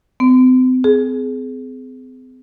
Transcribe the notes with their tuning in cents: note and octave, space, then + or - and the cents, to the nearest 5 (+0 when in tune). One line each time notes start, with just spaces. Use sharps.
C4 -40
G#4 +25